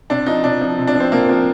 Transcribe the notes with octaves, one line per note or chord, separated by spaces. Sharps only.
C3 D4
F3 D#4
C3 D4
F3
C3
D4
F3
C4
C3 A#3
F3